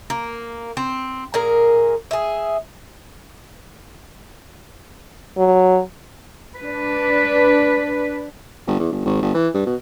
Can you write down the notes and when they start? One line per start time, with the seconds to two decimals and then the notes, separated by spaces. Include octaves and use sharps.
0.10 A#3
0.77 C4
1.34 A#2 G#4 A#4
2.11 G#4 E5
5.38 F#3
6.57 D4 B4
8.67 G1
8.80 E2
8.92 G1
9.05 G#1
9.22 G1
9.35 E3
9.54 G2
9.66 B2